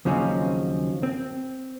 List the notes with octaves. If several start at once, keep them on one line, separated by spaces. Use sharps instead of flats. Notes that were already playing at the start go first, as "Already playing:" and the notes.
D#2 C#3 F3 F#3 C4 C#4
C4